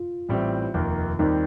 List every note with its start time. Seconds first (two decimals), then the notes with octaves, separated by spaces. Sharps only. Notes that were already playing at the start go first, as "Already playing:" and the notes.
Already playing: F4
0.29 A1 A2 G3 C4
0.74 F1 D#2 D#3 A#3
1.19 D#2 D#3 G3 C4 D#4 G4